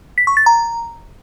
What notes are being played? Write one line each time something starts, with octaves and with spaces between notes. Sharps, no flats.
B6
C#6
A6
A#5